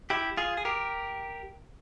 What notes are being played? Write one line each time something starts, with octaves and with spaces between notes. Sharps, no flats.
E4 G4
F4 G#4
G#4
G4 A#4